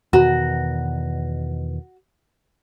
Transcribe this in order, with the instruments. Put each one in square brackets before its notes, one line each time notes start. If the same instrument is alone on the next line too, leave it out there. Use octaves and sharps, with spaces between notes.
[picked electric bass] E2 B2 D#3 [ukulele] F#4